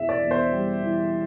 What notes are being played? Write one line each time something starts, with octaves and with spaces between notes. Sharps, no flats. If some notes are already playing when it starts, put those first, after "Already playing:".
Already playing: E1 E3 E5
D5
E2
C5
G3
E3